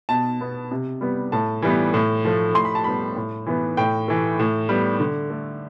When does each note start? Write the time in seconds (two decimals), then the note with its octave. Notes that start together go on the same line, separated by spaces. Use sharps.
0.09 B2 A5
0.41 B3
0.71 C3
1.01 G3 B3
1.32 A2 A5
1.62 E3 G3 B3
1.94 A2
2.25 F3 A3
2.54 A2 C6
2.65 B5
2.75 A5
2.84 G3 B3 B5
3.16 A2
3.46 E3 B3
3.77 A2 G5
4.08 E3 A3
4.39 A2
4.69 G3 B3
5.00 D3
5.30 A3